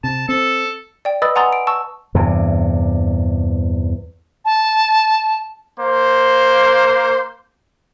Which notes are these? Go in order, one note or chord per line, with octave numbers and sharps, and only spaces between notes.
C3 A5
C4 A4
D5 G5
B4 D#5 B5 D#6 E6 A6
F#5 G#5 A#5 C6 D#6 A6
D7
A5 C#6 E6
E2 G2 C3
A5
A#3 C5